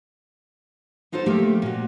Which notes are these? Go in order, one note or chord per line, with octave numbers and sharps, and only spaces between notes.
B3 D#4 F4 A4 C5
D3 F3 A3 A#3 G4
A#2 F#4